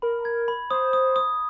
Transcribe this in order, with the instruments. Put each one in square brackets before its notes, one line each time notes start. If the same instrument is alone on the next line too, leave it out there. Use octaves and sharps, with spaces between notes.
[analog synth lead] A#4 [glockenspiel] B5
[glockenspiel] G#6
B5
[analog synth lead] C5 [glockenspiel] D#6
[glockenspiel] D#6
D#6